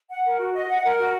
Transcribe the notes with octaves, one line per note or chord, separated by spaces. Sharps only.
F#5
A#4
F#4
D#5
F#5
A#4
F#4